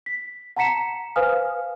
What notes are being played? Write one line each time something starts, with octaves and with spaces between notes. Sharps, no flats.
B6
F#5 A5 A#5 B6 C#7 E7
B4 C5 F5 G#5 D#6 F6